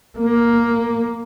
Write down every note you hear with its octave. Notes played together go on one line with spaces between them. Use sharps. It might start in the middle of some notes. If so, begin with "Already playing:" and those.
A#3